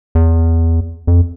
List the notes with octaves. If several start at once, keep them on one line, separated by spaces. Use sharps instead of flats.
E2
F2